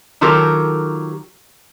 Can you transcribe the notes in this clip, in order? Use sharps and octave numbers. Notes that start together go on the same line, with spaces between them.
D#3 F#3 F4 G4 A4 A#4